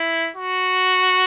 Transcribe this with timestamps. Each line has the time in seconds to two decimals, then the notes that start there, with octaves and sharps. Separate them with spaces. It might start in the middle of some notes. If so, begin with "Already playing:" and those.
Already playing: E4
0.36 F#4